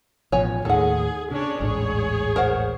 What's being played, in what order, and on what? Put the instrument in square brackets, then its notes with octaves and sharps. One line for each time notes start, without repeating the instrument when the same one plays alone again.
[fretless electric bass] A1 B2 F3 [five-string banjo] C#5 G#5
[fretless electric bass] D#2 A2 D#3 [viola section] G#4 [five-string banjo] A4 F#5
[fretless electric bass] C#3 [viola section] C#4 D4 C#5
[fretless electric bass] D#1 A1 G#2 [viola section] G#4 C#5
[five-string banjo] A#4 C5 F#5